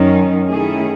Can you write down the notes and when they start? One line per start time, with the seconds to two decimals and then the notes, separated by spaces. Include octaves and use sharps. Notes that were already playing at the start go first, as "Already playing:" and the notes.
Already playing: F#2 D#3 F#3 C#4
0.47 D#3 A3 C#4 E4 G#4